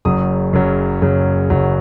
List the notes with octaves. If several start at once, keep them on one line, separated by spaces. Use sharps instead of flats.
F#1 F#2 C#3 F#3 D#6
F#1 F#2 C#3 F#3
F#1 F#2 C#3 F#3
F#1 F#2 C#3 F#3